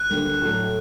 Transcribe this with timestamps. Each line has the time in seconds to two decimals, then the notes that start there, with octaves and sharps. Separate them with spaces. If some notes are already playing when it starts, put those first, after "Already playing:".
Already playing: F#6
0.10 D2 D3 G3 A#3
0.41 A2 F#3 A3